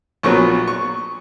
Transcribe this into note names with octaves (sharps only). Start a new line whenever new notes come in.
A#1 A#2 F#3 B3 C#6
C#6